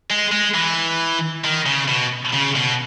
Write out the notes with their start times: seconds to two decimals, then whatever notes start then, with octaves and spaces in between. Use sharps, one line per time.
0.10 G#3
0.32 G#3
0.55 E3
1.44 D#3
1.66 C#3
1.88 B2
2.34 C#3
2.56 B2